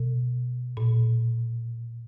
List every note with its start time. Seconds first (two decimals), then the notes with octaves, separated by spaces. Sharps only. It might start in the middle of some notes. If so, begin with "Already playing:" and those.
Already playing: B2
0.77 A#2